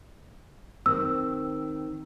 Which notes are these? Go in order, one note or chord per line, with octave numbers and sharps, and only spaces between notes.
D#3 C4 E6